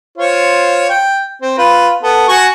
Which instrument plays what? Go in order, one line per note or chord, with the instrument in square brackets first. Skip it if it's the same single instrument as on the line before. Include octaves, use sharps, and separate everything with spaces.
[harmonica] F4 C5 C#5
G5
C4
F4 B4
B3 A4
F#4 G#5 C#6